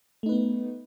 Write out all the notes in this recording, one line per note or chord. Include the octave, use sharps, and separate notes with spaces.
A3 B3 D#4 B4